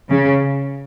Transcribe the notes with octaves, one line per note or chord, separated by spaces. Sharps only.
C#3